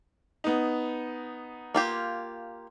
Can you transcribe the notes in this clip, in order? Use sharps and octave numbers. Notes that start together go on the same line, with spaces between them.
B3 D#4
A#3 F4 G4